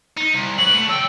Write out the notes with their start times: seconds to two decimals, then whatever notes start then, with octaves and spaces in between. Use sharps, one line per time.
0.17 D#4
0.33 C2
0.58 F#3 B4 F#7
0.73 D2 A3
0.89 F#3 G5 E6